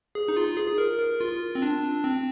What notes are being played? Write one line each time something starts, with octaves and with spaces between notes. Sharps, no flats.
G#4
D#4
F4
G#4
G#4
A#4
A#4
F4
C4
D4
C4